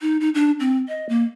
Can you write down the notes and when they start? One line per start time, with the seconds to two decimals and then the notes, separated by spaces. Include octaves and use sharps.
0.01 D#4
0.21 D#4
0.35 D4
0.60 C4
0.88 D#5
1.09 A#3